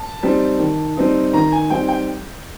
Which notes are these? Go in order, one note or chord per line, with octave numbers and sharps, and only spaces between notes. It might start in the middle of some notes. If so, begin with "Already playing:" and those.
Already playing: A5
G3 C4 D#4
D#3
G3 C4 D#4
D#3 A#5
G#5
G3 C4 D#4 G5
G5